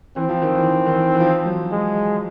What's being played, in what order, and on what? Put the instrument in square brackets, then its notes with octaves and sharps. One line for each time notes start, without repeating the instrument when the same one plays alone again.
[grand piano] E3 [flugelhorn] C4
[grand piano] F3
D#3
E3
D#3
D#3
E3
E3
F3
F#3
[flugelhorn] G#3